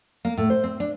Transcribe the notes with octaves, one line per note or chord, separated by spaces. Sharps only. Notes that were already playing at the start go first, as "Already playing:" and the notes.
A#3
A2
C5
C4
D4